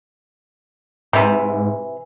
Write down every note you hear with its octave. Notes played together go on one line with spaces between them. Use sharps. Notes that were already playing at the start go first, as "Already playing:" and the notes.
G#2 C3 E3